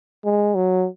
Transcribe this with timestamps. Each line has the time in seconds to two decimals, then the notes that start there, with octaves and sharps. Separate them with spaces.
0.25 G#3
0.55 F#3